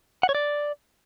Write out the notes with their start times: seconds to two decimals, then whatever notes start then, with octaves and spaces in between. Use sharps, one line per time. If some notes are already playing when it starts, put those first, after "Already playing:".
0.23 F#5
0.29 C#5
0.35 D5